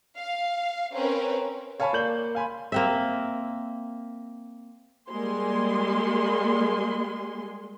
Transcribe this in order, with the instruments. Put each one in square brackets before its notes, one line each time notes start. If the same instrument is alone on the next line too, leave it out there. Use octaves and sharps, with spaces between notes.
[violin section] F5
C4 C#4 A#4 B4
[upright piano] C#5 F5 G#5 A5 B5 C#6
A#3 D5 G6 F#7
F5 G#5 B5 C6
[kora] A#3 C4 E5
[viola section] G3 G#3 A#3 G#5 C6